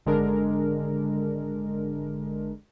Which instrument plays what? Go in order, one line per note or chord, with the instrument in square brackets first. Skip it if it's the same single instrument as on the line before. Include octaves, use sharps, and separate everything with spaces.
[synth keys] G#1 D3 G#3 D4 A#4